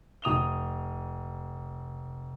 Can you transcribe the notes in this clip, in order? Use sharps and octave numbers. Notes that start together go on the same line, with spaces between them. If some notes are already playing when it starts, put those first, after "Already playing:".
F1 D#6 F7 G7